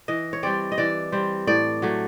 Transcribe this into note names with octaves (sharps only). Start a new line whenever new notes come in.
E3 D#5
C#5
G3 C4 D5
D#5
E3 D5
G3 C4
A2 D5
F#3 A3